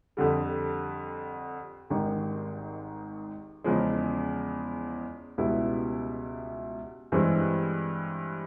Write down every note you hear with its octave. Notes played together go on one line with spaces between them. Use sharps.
F2 D3 G3
G#1 G#2 D#3 G3
E2 C#3 F3 G#3
C#2 B2 G3 B3 E4
G2 E3 G#3 C4